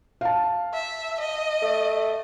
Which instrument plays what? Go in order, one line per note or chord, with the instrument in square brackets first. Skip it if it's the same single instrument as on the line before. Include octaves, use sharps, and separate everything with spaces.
[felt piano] F5 A5
[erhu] E5
D#5
[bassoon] A3